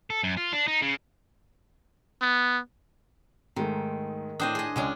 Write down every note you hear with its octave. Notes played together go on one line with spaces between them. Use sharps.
A4
F#2
F4
D4
D#4
C#3
B3
G#2 D#3 G#3 A3
A2 D4 C5 D#5 G5 D#6
G#4 D#5
C#2 G#3 C#4 D4